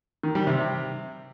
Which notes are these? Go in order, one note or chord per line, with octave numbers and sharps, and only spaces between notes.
D#3
G3
C3